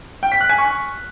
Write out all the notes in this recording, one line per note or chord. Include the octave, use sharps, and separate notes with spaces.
G5
B6
F#6
G#5
C#6